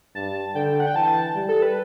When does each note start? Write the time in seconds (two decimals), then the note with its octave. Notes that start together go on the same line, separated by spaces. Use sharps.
0.15 G2 A5
0.55 D3 G5
0.80 F#5
0.87 G5
0.96 E3 A5
1.35 G3
1.49 A4
1.62 B4